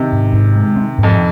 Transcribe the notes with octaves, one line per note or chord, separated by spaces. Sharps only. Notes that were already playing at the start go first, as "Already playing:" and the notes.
Already playing: C3 D#3
G#2
G#2
G#3
C4
G#2
F2